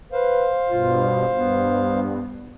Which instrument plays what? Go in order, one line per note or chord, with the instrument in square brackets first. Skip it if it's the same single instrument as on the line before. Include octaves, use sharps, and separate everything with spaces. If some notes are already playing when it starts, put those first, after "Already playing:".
[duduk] B4 [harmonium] C5 F5
[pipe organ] G2 B2 [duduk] F4
[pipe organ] G2 [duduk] B3